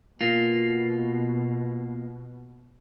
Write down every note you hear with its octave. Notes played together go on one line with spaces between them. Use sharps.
B2 A#3 F4